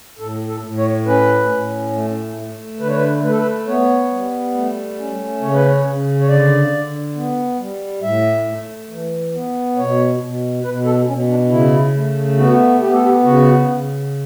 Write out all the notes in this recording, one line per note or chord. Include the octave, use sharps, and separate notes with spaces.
A2 A4
A4
A2
C#5
C#4 B4
A2
A3
A3
D3 B4
C#5
B4
A3 B4
A4
B4
B3 C#5
G3
A3
C#4
C#3 C#5
B4
C#5
C#3
C#5
D3 D5
D3
B3
G3
A2 E5
A3
E3
B3
B2 C#5
B2
B2 B4
A4
B2 C#4
D4
C#3 E4
A3
B3 F#4
B3 G4
A4
G4
C#3 F#4
C#3